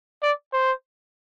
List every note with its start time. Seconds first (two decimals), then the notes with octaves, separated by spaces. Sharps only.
0.23 D5
0.53 C5